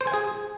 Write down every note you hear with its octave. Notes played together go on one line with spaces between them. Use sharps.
C5
G#5
G#4